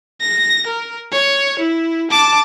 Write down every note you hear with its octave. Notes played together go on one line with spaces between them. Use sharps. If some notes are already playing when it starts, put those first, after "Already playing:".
A#6
A#4
C#5
E4
A5 D6